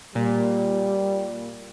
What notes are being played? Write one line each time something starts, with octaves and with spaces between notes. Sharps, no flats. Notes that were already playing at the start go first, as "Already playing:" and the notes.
A#2 G3